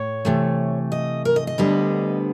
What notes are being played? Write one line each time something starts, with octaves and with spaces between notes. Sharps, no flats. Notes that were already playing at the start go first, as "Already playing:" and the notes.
Already playing: A2 C#5
C3 E3 A3
D#5
A#4
D#5
D#5
D2 D3 G3 B3